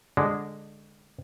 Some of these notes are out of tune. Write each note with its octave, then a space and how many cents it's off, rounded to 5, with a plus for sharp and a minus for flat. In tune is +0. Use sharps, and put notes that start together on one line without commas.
D3 +0 G#3 -10 D5 +0